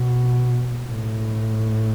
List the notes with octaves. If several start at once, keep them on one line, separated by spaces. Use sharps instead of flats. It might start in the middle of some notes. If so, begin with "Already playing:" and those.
Already playing: B2
A2